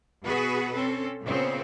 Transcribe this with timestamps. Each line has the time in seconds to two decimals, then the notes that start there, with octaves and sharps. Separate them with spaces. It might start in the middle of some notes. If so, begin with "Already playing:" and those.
0.24 B2 B3 F#4 G#4 B4
0.72 C4 C#4 A4
1.24 A#2 C#3 B3 C4